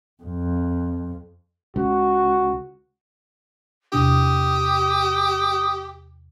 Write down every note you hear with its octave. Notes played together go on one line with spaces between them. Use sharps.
F2
C#2 F#4
E2 C3 D4 G4 D#6